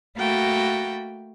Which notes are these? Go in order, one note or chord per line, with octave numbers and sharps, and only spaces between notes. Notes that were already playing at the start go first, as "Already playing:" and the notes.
A3 A#3 F#4 G5 B5 A6